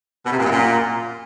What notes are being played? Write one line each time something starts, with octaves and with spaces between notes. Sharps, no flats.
B2
C3
A#2
F#2
A#2